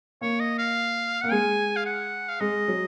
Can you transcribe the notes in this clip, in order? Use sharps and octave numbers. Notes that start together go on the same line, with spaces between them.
A#3 C#5
D#5
F5
A#3 F#5
G#3 G#5
F5
F#5
F5
G#3 D#5
F#3